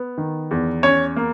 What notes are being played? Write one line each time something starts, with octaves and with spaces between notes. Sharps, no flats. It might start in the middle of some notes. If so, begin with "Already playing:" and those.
Already playing: B3
D#3
E2
C#4 C#5
A#3